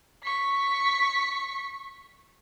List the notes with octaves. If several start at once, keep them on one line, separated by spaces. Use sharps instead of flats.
C#6 B6